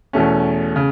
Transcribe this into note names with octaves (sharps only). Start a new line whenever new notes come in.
E2 B2 A3 C#4
C#3